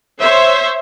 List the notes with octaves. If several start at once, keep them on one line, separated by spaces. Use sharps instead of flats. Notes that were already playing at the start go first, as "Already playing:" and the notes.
C5 C#5 E5